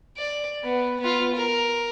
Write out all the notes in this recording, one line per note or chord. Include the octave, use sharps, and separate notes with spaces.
D5
B3
B3 F4
A#4